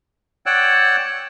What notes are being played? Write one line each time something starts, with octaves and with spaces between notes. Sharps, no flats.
C#5 D5 F#5 G5 E6 F#6